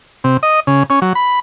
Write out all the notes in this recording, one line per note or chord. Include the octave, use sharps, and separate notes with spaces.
C3
D#5
C#3
C#4
F#3
B5